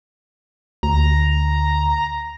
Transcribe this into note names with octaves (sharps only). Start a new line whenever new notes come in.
D2 A#5